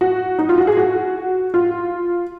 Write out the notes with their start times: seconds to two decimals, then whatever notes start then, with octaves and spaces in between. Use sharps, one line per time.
0.01 F#4
0.39 D#4
0.49 F4
0.58 F#4
0.67 G#4
0.77 F#4
1.54 F4